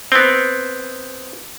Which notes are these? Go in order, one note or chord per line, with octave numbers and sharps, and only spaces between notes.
B3 C4